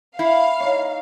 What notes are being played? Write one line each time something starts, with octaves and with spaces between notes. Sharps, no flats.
E4 F5
D#4 C#5